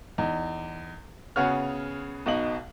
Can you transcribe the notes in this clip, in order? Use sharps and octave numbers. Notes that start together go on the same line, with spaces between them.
E2 D#4
C#3 B3 F#4 G#4 C#5 F6
B1 B2 D#4 F#7